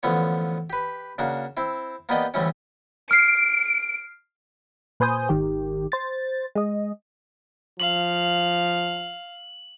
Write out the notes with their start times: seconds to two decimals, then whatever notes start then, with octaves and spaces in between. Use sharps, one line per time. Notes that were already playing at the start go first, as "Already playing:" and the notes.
0.03 A1 D3 F3 B3 C#5
0.70 G4 B4
1.18 C#3 A#3 D4 F#4
1.57 C4 E4
2.09 A#3 B3 G4 D5 D#5 G5
2.34 A1 D2 A2 G3 A3 C#4
3.11 F6 C7 D7
5.00 A#2 B4 C5 G#5 D#6 G6
5.29 G#1 D#3 G4
5.92 C5 A6
6.55 G#3 D#5
7.80 F3 F5 F#7